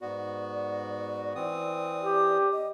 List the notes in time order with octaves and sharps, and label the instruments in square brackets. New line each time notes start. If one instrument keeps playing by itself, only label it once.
[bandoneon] G#2 B3 F#4 [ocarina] D5
[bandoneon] E3 C4 D#6
[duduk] G4
[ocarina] D#5